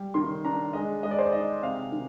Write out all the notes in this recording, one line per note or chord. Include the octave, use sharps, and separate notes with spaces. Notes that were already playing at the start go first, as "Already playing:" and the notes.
Already playing: G3
D#3 C6
D4 A#5
G#3 D#5
G#3 D#5
D5
C5
D5
D#4 D#5
C3 F5
D#3